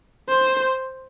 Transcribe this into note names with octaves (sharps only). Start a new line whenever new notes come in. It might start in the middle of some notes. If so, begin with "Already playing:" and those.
C5